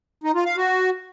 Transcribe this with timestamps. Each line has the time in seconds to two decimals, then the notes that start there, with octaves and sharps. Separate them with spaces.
0.24 D#4
0.35 F4
0.46 F5
0.57 F#4